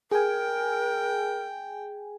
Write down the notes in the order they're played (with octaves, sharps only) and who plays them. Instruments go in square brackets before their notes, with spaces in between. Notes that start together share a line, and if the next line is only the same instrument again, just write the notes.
[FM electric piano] G#4 G#5 [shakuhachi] A#4 [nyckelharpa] G5